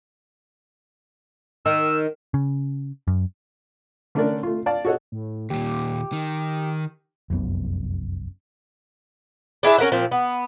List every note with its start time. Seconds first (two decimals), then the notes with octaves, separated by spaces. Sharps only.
1.66 D#3 E6
2.34 C#3
3.07 F#2
4.15 D3 A3 C#4 D4 A#4 D5
4.43 A3 F4
4.66 D5 F5 A5
4.85 F#4 G#4 A4 C#5 D#5 F#5
5.12 A2
5.50 D#2 A#2 G4
6.13 D#3
7.30 F1 C2 F#2 B3
9.63 D4 E4 G#4 E5
9.78 C#4 A#4 E5 F#5
9.92 A#2 F3 C4
10.11 B3